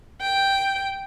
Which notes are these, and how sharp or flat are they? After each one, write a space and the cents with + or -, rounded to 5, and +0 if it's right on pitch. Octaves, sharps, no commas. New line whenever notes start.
G5 +0